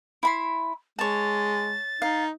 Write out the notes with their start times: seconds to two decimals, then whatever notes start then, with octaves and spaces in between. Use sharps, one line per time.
0.23 E4 B5 C6
0.99 G#3 C#5 A5 A6
2.02 D#4 F5